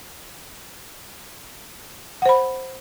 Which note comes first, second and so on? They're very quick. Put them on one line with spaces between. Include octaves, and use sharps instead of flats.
F#5 C5 B5